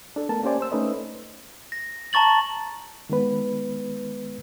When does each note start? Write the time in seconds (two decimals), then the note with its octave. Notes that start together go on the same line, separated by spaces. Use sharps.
0.16 D4 A4
0.29 A3 B3 A#4 A5
0.43 A#3 C#4 G4 C5 D5 G#5
0.60 C5 E6
0.72 A3 C#4 D#4 B4 C5 D#5
1.72 A#6
2.13 A5 A#5 C#6 A6 F#7
3.10 D#3 G#3 B3 B4